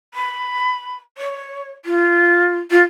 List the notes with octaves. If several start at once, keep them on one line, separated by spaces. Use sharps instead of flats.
B5
C#5
F4
F4